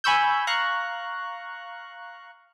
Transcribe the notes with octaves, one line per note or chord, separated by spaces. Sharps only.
G#5 B5 C#6 E6 G6
F5 A#5 C#6 F#6